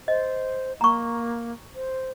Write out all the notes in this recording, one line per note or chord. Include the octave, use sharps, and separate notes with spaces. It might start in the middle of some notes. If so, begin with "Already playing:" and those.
C5 D#5
A#3 A#5 C#6
C5